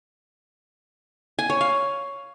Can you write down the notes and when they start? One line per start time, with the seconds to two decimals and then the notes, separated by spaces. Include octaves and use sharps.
1.39 G#5
1.50 C#5
1.61 F5